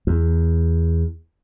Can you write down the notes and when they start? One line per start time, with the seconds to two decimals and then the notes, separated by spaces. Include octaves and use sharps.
0.07 E2